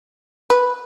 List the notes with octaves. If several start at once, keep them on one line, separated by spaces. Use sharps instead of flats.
B4